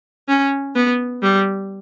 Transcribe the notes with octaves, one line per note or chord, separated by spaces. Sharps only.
C#4
B3
G3